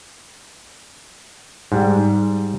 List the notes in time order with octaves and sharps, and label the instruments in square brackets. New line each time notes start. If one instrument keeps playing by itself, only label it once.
[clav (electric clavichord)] G#2 G3